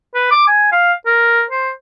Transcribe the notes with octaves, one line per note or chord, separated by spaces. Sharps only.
B4
D6
G#5
F5
A#4
C5